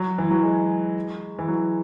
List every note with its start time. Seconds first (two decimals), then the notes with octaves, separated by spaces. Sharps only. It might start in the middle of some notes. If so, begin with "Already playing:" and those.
Already playing: F#3
0.18 E3
0.31 F#3
0.43 G#3
1.39 E3
1.48 F#3